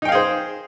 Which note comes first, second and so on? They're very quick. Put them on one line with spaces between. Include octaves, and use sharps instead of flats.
D#4 G5 F5 G#4 C5